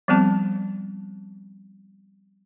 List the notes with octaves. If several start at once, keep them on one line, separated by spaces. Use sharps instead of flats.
F3 G3 B3 C4 A5